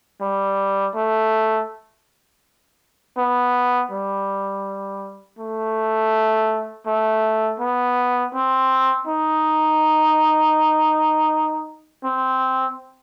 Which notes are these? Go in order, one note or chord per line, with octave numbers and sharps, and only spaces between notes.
G3
A3
B3
G3
A3
A3
B3
C4
D#4
C4